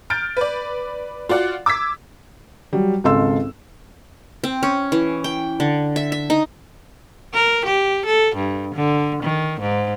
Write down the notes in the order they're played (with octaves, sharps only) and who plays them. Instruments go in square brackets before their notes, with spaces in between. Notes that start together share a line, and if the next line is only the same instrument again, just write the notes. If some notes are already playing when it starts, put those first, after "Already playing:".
[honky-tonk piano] F6 G6 A6 D7
B4 D5
F4 F#4 D5 F#5
D6 E6 G#6 B6
[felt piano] F#3 G3
G#1 C#2 A4 F5 C6 E6
[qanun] C4
C#4
E3
G5
D3
E5
E5
D#4
[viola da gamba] A#4
G4
A4
G2
D3
D#3
G#2